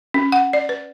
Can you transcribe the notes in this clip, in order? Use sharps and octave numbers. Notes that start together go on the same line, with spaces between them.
C#4
F#5
D5
B4